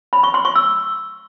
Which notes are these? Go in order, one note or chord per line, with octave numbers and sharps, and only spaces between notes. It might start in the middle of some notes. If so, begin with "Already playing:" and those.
B5
C#6
C6
C#6
E6